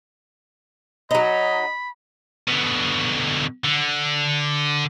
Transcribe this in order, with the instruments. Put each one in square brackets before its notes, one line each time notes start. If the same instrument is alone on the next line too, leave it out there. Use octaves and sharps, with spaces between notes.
[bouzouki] F#3 D#4 [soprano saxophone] D#5 [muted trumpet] B5
[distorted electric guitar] B2 D3
D3